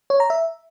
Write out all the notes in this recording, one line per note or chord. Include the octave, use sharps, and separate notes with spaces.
C#5
A#5
E5